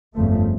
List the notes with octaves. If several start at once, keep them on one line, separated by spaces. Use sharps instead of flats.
G1 F2 C#3 F3 A3